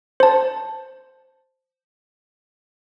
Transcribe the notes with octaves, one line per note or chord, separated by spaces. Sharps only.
C5 A5